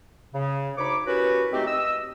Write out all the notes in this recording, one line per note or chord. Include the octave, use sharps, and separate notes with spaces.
C#3
D2 D#4 C#5 B5 D6
C#4 E4 F#4 G4 A#4 B4
G#3 A3 C4 D#4 F#4 G4
D#5 E6